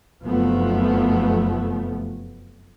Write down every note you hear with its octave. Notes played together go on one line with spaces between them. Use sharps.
F1 F#2 F3 A3 B3